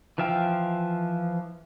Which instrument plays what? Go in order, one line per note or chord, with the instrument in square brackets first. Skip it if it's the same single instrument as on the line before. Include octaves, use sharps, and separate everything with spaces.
[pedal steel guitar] E3 F3 E5 F5 G5